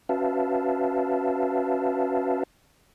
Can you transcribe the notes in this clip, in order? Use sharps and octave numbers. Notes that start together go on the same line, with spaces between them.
C#4 F#4 B4 E5 F5 A5